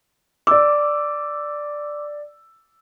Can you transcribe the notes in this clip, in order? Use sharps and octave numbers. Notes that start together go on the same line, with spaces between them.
D5 D6 E6